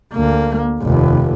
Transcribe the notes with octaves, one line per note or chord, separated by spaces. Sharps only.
D2 A#3
F1 D#2